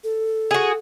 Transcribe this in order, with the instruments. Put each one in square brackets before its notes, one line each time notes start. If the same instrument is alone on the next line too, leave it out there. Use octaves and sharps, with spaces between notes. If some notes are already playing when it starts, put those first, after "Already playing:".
[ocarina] A4
[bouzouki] F#4 G#4